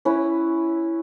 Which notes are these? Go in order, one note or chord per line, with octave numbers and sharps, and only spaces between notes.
C#4 E4 B4